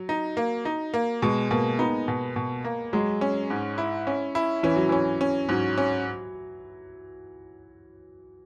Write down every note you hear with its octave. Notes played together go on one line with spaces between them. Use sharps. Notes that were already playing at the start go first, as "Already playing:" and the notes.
Already playing: F#3
D#4
A#3
D#4
A#3
B2 G#3
B2 A#3
B3 D#4
B2
B2
A#3
F#3 G#3
C#4
G#2
E4
C#4
E4
E3 C#4
F#3
E3 C#4
C#4
G#2 F#3
C#4